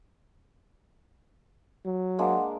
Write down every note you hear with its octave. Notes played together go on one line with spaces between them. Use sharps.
F#3
G#3 A#3 D4 F#5